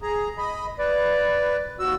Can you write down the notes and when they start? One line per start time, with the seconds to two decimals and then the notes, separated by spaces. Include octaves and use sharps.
0.02 G#4 A#5
0.38 D#5 B5
0.79 B4 D5
1.79 D#2 F#4 E6